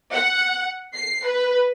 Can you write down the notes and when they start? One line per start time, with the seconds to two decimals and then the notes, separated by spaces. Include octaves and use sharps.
0.13 F#5
0.95 C7
1.26 B4